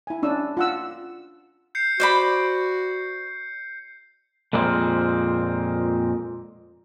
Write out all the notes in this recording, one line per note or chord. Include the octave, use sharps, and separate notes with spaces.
E4 G#5
C#4 D4 E6
F4 F#5 E6
G6 C7 C#7
F#4 C5 D5 B5
F2 A#2 G#3 A#3 C4